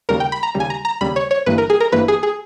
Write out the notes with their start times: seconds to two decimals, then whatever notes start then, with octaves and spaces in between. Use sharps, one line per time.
0.09 D#2 C#3 G3 A#4
0.20 G5
0.32 B5
0.43 A#5
0.55 D#2 C#3 G3
0.60 G#5
0.70 A#5
0.85 A#5
1.01 D#2 C#3 G3 B5
1.16 C#5
1.31 C#5
1.46 G1 G2 E3 A#3 B4
1.58 A#4
1.70 G#4
1.80 A#4
1.92 G1 G2 E3 A#3 B4
2.08 G#4
2.23 G#4